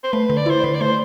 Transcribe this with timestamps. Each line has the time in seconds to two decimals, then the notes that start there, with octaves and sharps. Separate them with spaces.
0.04 C5
0.12 A3 B4
0.30 D3
0.36 D5
0.46 E4 C5
0.64 D3 B4
0.74 D5
0.81 A3 C5